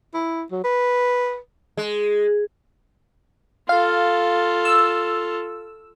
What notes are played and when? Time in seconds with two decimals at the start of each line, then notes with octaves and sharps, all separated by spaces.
0.14 E4
0.52 F#3
0.64 B4
1.77 G#3
3.69 F4 A4 F5
4.65 E6